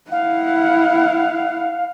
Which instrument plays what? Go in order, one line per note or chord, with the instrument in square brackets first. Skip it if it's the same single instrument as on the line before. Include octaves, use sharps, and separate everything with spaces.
[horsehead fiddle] E4 F#5 [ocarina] F5